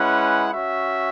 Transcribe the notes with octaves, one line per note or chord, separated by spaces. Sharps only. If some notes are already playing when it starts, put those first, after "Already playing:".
Already playing: G#3 C#4 E4 B4 F#5
C#4 F#4 E5